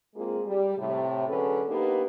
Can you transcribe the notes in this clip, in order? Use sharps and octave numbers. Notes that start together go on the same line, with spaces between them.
G#3 A#3 C4 F4 G#4
G3
A2 C3
D3 F#3 C#4 G#4 A4 B4
A#3 B3 D4 D#4 G4 B4